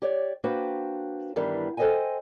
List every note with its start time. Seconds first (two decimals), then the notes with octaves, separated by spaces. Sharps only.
0.02 G4 C#5 D5
0.44 A#3 D4 F#4 B4 C5 G5
1.36 G2 D#3 E3 G3 B3 D4
1.77 A4 C5 C#5 D#5 G5 G#5